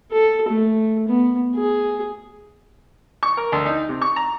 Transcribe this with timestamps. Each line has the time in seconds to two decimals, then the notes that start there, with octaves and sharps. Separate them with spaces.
0.11 A4
0.49 A3
1.08 B3
1.56 G#4
3.23 C#6
3.37 A#4
3.52 D2
3.66 D#4
3.89 C3
4.02 C#6
4.16 A#5